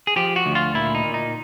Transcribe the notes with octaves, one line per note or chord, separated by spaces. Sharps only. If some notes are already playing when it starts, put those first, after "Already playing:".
G#4
F3 G4
F#4
D2
F4
A#2 E4
D#4
A#2
D#4